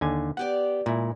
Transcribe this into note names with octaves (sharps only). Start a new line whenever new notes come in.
D#2 D3 G#5
B3 G4 D5 F#5
D2 A#2 G#3 E4